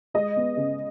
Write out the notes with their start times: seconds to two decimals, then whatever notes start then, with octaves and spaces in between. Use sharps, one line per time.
0.14 G#3 D#5
0.36 B3
0.57 C#3